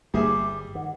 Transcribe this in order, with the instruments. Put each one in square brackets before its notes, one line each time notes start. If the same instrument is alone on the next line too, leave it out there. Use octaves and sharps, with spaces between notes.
[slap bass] G1 [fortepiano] G3 G#4 E5 [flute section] D6
[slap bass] D#3 [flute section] F#5